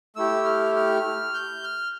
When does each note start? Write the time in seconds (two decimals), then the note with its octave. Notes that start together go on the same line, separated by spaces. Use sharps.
0.16 A3 E4 G4 E6
0.45 F6
0.75 F6
1.34 G6
1.64 F6